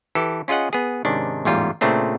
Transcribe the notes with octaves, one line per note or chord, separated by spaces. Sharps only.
E3 G4 A4
C#4 F4 G#4 D#5 F#5
B3 G#4
G#2 C3 D#3 C#4 D4
A1 E2 G#2 G3 F4
A#2 C#3 A3 C4 D4